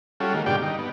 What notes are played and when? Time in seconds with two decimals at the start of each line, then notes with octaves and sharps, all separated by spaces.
0.20 G3 C#4 F4 F#4 A4
0.34 D#3 G#3 A#3
0.46 G2 B2 D3 G4 D5 G5
0.62 D#4
0.78 B3